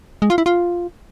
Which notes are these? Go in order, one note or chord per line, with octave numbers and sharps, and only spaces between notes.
G#3
F4
E4
F4